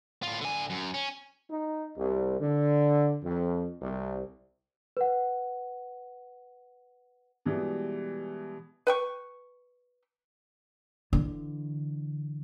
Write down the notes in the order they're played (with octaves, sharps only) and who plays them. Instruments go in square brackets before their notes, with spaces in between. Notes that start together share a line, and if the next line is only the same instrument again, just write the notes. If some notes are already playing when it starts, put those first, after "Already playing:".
[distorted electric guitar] A2 F4
D3 G#5
F#2
C#4
[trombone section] D#4
C2
D3
F2
C2
[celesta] B4 F#5
[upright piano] B2 E3 G3 G#3
[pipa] B4 G5 C#6
[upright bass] D3 E3